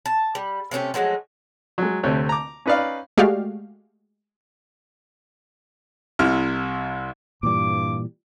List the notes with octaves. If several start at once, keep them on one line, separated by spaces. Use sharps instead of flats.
A5
G3
C3 A3 C#4 G4
F3 F#3 G#3 A3
F#3 G#3
D2 C3 A3 C#5
A#5 D6
C#4 D#4 B4 D5 F5
G#3 A3 F#4 G4 D5 F5
C2 C3 E4 F6
G2 A#2 E3 G3 D6